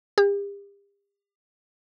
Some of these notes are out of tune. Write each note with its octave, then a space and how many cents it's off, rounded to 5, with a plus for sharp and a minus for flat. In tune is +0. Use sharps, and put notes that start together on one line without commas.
G4 +40